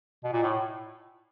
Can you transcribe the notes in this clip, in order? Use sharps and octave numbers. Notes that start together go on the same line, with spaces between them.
B2
A#2
A2